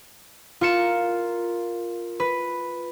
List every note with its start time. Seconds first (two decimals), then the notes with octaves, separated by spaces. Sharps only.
0.61 F4 A#4 C#7 E7
2.20 B4